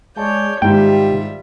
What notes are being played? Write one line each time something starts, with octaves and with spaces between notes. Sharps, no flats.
G#3 C#5 D5 A5 G6
G#2 D#3 G3 F4 G4 E5 G5